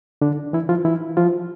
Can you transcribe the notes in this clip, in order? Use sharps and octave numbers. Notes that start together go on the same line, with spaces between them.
D3 D4
E3 E4
F3 F4
E3 E4
F3 F4